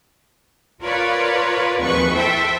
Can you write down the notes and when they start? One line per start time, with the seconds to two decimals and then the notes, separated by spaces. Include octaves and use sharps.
0.83 F4 A#4 B4 C#5 D5
1.79 G#1 D#2 F3 B4 C#6
2.14 E4 A4 C5 E5 G5